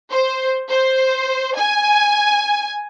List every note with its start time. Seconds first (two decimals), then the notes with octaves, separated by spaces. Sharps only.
0.11 C5
0.70 C5
1.57 G#5